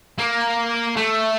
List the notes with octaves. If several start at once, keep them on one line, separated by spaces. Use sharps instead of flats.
A#3
A3